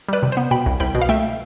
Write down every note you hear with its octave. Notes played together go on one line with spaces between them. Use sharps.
G3 B4 D5
C3
B3 C5
B2 G5 B5
C2
C2 G5 B5
B2
F5
A3 E5 G5